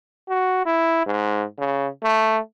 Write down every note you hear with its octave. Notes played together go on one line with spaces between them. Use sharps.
F#4
E4
G#2
C#3
A3